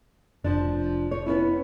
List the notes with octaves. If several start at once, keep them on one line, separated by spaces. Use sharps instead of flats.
F1 F3 D4
C#5
B3 C#4 E4